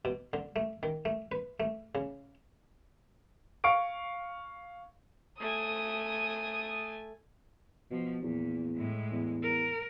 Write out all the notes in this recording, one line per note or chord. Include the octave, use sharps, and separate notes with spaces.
B2
D3
A3
D#3
A3
B4
A3
C#3
F5 C#6 D7
A3 G#5 D#6
B2 F3
E2 A#2
A2 G#3
E2
A#4